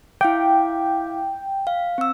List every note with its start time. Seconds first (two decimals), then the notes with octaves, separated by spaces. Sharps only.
0.21 E4 F5 G5 D6
1.67 F5
1.98 C4 E6